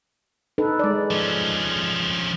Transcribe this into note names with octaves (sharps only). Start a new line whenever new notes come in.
D#4 A4 B4
G#3 D5
F3 C#4